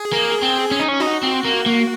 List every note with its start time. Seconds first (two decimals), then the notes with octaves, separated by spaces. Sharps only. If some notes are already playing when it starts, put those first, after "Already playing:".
Already playing: G#4
0.13 A#3
0.42 C4
0.71 C#4
0.79 D#4
0.89 C#4
1.00 D#4 F#4
1.23 C4
1.44 A#3
1.66 A#3